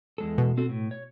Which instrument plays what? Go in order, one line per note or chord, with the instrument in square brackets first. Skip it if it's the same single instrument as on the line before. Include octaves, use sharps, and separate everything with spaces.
[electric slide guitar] E2 G#3 A4
[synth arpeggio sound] B2
[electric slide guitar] C4 F#4 A4
A2
C#5